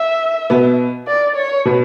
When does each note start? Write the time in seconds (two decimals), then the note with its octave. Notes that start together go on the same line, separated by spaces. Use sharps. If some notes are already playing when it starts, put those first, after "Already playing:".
Already playing: E5
0.50 B2 B3
1.08 D5
1.36 C#5
1.65 B2 B3